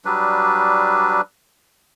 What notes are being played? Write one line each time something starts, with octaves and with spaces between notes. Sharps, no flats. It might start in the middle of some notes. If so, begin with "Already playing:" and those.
F#3 G3 D4 B4